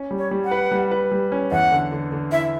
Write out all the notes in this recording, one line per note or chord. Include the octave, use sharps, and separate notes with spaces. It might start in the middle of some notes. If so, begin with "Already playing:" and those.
Already playing: C#4
G3
C#5
G3
F#5
B4
G3
B4
G3
C#4
E2 F#5
D3
D3
D3
E4 E5